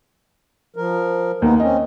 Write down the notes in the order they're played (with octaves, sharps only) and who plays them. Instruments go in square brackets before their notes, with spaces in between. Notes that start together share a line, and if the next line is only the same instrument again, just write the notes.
[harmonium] F3 A#4
[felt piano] D#2 [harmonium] B3 D#4
[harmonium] C4 C#4 [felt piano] D#5